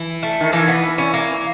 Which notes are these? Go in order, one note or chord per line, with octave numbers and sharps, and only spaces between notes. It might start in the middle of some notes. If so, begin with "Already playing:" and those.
Already playing: E3
A3
D#3
E3 A#3
B3
C#4
A#3